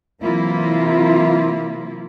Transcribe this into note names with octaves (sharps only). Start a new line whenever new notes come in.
C3 E3 F#3 A#3 E4 F4